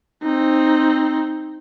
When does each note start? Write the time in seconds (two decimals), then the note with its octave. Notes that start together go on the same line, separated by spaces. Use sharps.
0.23 C4 D#4